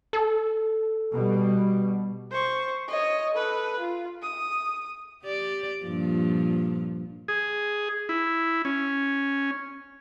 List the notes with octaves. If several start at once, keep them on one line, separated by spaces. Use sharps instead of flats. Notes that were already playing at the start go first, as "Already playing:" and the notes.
A4
B2 G3
C5 C#6
C#5 D#5
A4 B4
F4
D#6
G4 D5
G2 A#2 F3
G#4
E4
C#4